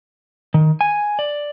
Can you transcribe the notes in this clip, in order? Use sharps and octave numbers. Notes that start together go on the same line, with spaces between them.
D#3
G#5
D5